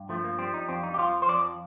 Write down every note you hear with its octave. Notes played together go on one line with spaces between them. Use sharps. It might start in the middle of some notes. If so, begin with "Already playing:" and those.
Already playing: G2
F3 A3
A#3
G3 C4
D#4
F2 C4
D#4
G4
F3 F4
C5
F2 D5